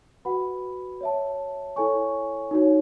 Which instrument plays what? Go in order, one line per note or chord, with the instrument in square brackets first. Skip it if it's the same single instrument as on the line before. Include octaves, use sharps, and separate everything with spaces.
[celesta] F#4 B4 F#5 B5
C#5 E5 A5
E4 A4 C#5 G#5 C#6
D#4 F#4 C#5